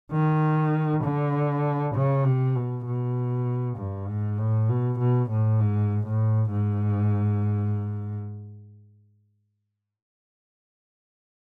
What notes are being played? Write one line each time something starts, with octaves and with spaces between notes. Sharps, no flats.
D#3
D3
C#3
C3
B2
B2
G2
G#2
A2
B2
B2
A2
G#2
A2
G#2